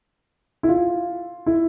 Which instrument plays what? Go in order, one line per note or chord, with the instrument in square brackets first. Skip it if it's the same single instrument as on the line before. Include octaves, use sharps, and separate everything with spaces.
[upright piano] E4
F4
E4